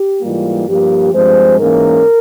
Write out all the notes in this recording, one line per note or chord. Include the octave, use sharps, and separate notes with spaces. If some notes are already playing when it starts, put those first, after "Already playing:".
Already playing: G4
G#2 E3 G3 A#3 F4
G2 F3 A#3 G4
G2 F3 G#3 C4 C5
G#2 E3 A#3 C#4 A#4